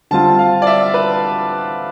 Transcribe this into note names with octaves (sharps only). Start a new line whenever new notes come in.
D3 G3 C4 F4 A5
F5
D5
E5
B4